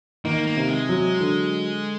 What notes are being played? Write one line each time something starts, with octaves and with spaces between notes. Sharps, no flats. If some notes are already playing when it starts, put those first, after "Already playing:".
D#3 A#3
A#3
C3
G#3
F#3
D3